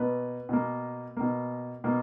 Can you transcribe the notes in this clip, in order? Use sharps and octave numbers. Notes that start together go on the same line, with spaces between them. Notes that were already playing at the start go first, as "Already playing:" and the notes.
Already playing: B2 A#3 B4
B2 A#3
B2 A#3
B2 A#3